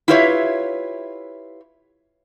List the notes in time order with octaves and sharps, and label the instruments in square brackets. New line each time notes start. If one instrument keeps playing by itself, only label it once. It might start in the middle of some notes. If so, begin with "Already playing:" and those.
[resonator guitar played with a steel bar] E4 F4 G4 B4 C#5 E5